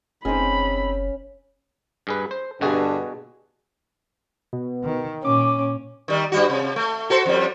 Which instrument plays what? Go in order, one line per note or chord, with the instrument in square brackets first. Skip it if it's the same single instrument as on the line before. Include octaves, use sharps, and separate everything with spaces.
[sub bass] F#1 [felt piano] C4 D#4 G#4 [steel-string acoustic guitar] C#4 [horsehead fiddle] B5
[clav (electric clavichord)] G2 G#4 B4
C5
[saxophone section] G2 D3 [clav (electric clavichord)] B2 F#4 G#4
[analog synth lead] B2
[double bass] D#3
[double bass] A#2 [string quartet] C#4 [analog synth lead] D6
[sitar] D#3 G3
G2 G3 F#4
C3
A3
F#4 A4 C5
F2 G3